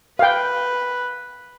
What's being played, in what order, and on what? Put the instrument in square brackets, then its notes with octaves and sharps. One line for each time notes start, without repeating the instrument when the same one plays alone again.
[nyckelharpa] B4 [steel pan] F5 G5